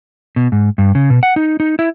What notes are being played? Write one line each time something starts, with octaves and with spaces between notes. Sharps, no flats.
B2
G#2
G2
C#3
B2
F#5
D#4
D#4
E4